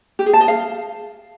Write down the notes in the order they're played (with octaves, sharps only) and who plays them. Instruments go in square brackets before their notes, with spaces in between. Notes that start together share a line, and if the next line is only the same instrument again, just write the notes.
[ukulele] G4
G#4
A5
D#5
F5